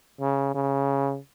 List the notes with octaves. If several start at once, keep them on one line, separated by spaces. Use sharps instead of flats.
C#3
C#3